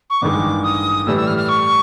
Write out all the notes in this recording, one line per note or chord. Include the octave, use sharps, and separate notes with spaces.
C#6
A1 G2 D#3 G#3 D6
D#6
A2 E3 G3 E6
E6
F6
F6
C#6